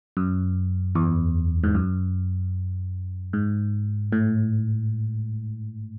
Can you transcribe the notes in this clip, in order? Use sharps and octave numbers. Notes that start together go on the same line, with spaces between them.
F#2
E2
G#2
F#2
G#2
A2